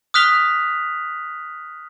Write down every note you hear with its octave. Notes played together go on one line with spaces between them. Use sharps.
D#6 F6 F#6 B6 F7 G7